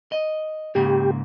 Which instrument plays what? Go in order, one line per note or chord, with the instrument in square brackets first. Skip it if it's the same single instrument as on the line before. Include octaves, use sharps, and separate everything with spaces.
[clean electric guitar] D#5
[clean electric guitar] G#2 C#3 A#3 [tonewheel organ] G4